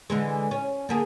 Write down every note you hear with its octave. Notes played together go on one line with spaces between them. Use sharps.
D3 E3 G#3
C#4
D3 A#3 G#4